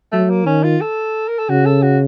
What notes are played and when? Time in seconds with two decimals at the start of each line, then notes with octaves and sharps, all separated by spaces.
0.12 F#3 A3
0.30 A#3
0.46 D#3 C#4
0.63 F4
0.81 A4
1.28 A#4
1.39 A4
1.50 C#3 F#4
1.66 A4
1.83 F#4